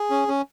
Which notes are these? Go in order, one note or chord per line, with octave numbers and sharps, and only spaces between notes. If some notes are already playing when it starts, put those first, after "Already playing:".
Already playing: G#4
C#4
C#4